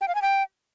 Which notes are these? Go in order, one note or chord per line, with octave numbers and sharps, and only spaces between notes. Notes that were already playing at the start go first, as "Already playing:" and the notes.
G5
F5
G#5
G5